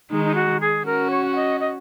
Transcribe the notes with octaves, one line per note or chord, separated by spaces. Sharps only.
D#3 G#3 D#4
D#4
F#4
G#4
C#4 F#4 A#4
C#5
F#5
D#5
D#5